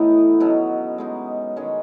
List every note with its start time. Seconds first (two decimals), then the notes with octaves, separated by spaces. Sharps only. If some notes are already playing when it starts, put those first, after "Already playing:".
Already playing: A2 E3 B3 D#4
0.40 B2 F#3 C#4
0.98 G#3 B3 D#4
1.56 D#3 G#3 C#4 G#4